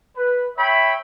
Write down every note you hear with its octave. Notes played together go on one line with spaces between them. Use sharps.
B4
C#5 E5 G5 B5